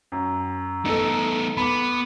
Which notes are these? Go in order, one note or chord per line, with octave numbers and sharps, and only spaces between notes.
F#2
A3 B3 D#4 A4
B3 B5 D6